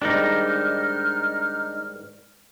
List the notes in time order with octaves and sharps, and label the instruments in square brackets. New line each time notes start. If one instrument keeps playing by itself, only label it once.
[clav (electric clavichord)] G#2 D#3 G3 [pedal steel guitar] D4 D#4 [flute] F6